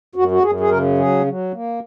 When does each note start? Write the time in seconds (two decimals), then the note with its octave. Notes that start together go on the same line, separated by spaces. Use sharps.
0.15 F#2 F#4
0.31 F#4
0.43 F#2 G#4
0.60 G#4
0.70 C#3 A#4
0.98 F#3 G#4
1.26 F#3
1.53 A#3